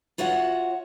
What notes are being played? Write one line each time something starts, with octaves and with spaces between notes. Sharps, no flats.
F4 F#4 C#5 E5 F#5